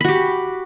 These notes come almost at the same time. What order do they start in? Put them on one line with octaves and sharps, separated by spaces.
B5 F#4 G4